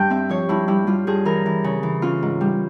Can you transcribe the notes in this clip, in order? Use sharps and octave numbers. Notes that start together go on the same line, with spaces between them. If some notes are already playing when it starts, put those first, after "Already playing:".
Already playing: G2 G5
C4 E5
F3 C#5
G2 E4
G3 E4
G3 F4
G2 G#4
E3 A#4
E3
C#3
E3
C#4 F4
G#2
G3